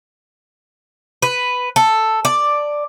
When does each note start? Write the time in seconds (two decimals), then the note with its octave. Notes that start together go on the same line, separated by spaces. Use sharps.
1.22 B4
1.76 A4
2.25 D5